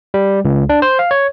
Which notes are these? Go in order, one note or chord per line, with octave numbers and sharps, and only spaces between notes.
G3
C#2
D4
C5
F5
C#5